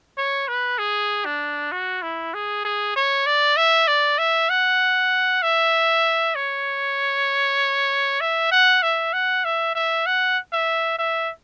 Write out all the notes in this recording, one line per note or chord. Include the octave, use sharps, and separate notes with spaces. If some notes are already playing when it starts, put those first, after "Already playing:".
C#5
B4
G#4
D4
F#4
E4
G#4
G#4
C#5
D5
E5
D5
E5
F#5
E5
C#5
E5
F#5
E5
F#5
E5
E5
F#5
E5
E5